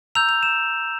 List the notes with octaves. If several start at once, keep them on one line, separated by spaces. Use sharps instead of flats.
A#5 E6 G6 F7
F7
E7